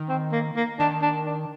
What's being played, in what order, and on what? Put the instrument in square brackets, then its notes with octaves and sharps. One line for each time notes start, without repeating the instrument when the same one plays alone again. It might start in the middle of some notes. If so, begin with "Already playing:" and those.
Already playing: [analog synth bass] D#3
[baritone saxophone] C4
A#3
A#3
[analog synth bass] D#3 [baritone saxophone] D4
[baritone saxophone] D4
D4